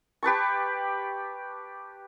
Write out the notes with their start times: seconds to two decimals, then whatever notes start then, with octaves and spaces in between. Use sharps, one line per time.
0.23 G4 B4 A5 C#6